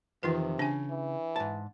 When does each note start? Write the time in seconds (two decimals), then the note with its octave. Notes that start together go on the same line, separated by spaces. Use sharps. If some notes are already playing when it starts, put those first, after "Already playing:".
0.23 F2 C3 D#3 E3 F4 B4
0.59 C#3 D4 G#5
0.91 E3
1.36 G#2 A5